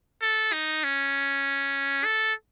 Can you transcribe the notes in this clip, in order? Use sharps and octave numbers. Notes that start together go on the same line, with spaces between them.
A4
D#4
C#4
A4